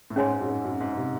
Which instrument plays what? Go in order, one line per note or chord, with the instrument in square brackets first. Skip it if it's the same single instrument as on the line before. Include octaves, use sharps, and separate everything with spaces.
[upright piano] A2
[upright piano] G#2 [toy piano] C#4 G#4 C#5 G#5 C6
[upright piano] G#2
F#2
G#2
F#2
G#2
C3